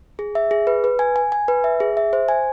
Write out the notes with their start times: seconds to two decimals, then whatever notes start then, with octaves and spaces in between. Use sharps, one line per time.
0.19 G#4
0.35 E5
0.51 G#4
0.67 B4
0.84 B4
0.99 G#5
1.16 G#5
1.32 G#5
1.48 B4
1.64 E5
1.80 G#4
1.97 E5
2.13 C5
2.28 G#5